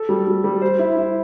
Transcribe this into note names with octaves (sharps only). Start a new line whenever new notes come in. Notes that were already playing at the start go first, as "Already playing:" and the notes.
Already playing: A4
G3
G3
G3
C5
E4
E4